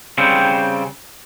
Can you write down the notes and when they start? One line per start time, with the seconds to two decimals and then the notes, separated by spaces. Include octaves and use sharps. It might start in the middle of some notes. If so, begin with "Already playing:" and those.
0.18 C#3 G3 C4